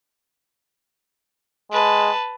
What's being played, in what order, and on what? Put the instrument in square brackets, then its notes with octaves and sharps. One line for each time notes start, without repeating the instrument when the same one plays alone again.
[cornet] G#3 [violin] B4 A5